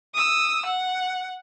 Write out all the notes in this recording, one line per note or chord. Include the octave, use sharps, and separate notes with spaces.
D#6 E6
F#5